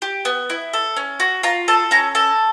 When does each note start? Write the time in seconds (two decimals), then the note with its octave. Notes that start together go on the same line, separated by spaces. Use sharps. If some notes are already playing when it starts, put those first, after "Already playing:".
0.02 G4
0.25 B3
0.50 E4
0.73 A4
0.97 C#4
1.20 F#4
1.43 F4 A#5
1.68 A4 A5
1.91 C#4 A#5
2.15 A4 A5